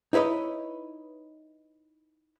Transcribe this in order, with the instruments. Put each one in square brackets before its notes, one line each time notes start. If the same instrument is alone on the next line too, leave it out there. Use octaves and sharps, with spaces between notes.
[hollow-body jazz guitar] D#4 E4 B4 C#5 D#5